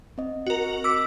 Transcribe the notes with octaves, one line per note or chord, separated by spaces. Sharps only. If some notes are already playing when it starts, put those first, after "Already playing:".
C4 D#5
F#4 A#4
D6 E6 B6